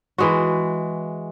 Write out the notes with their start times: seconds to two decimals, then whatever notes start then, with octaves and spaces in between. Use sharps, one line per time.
0.18 E3 G#3 F#4